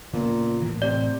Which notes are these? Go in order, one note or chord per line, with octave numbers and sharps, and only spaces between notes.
A#2 C#3 B3
A2 E3
C3 D5